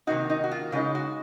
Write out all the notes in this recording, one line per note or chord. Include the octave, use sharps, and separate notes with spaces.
C3 D#3 A#3 D#4 F#4
D#4
F#4
F4
C#3 G#3 D#4 F4
F#4